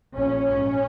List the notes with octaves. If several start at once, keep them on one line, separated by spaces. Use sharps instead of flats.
A#1 A#2 C#4
A#1 G#2